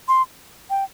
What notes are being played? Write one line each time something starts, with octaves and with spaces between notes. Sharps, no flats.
C6
G5